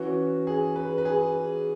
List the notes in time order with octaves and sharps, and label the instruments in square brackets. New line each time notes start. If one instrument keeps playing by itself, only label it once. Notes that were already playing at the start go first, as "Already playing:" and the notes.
Already playing: [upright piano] E3 C#4 F#4
G#4
B4
B4
G#4